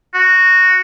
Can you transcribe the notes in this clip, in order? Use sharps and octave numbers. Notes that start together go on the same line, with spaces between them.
F#4